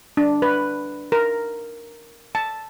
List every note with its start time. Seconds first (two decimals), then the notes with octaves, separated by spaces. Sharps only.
0.17 D4
0.42 B4
1.12 A#4
2.35 A5